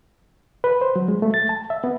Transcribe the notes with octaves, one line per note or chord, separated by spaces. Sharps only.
B4
C5
F#3
G#3
A3
A6
A5
E5
B3